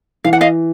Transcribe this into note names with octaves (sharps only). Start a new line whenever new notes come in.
E3 F5
F#5
D#5 F5